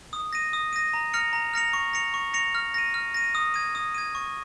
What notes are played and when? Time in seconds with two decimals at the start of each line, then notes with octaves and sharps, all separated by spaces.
0.13 D#6
0.33 A#6 D#7
0.53 D#6
0.73 A#6 D#7
0.94 A#5
1.13 F6 A#6 C#7 F7
1.33 A#5
1.53 F6 A#6 C#7 F7
1.73 C#6
1.93 A#6 C#7 F7
2.14 C#6
2.34 A#6 C#7 F7
2.55 F6
2.74 A#6 D#7
2.94 F6
3.14 A#6 D#7
3.35 D#6
3.54 G#6 D#7
3.75 D#6
3.94 G#6 D#7
4.15 C#6